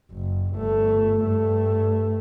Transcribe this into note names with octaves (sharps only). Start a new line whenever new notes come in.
F#1
G1 A3
G2 A3